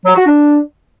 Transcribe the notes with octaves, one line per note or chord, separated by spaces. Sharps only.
F#3
F#4
D4